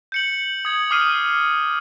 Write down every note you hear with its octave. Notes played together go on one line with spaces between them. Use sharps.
G6 C#7 F#7
D#6 G#6
D6 D#6 F6 C7 D#7